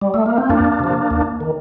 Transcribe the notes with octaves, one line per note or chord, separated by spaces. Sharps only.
G3
A3
A#3
C4
F2 A#3 D4
C3 F3
D#2
D#3